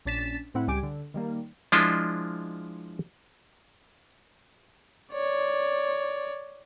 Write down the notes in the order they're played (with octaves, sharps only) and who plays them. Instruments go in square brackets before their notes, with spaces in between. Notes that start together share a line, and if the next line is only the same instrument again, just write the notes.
[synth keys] A#1 C#4 D4 A6 B6 E7
A2 C4 E4 F#5
C#2 G3 G4 G#5 D6 D7
D3
D#3 G3 A#3
[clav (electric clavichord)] F3 G#3 D4 E4 F4 D#5
[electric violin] C#5 D5